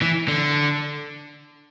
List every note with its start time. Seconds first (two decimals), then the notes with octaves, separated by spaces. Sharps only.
0.02 E3
0.28 D3